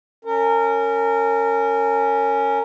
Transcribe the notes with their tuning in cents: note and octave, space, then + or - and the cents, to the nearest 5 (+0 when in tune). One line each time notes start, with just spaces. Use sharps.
C#4 +0 A#4 -25